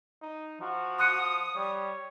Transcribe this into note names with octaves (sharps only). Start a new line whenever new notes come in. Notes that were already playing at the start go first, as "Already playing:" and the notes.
D#4
F3 F#4
C6 D#6 F#6 C#7
G3 C#5